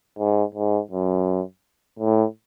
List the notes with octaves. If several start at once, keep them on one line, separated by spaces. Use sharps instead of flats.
G#2
G#2
F#2
A2